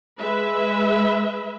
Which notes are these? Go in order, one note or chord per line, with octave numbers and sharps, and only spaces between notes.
G#3 B4 E5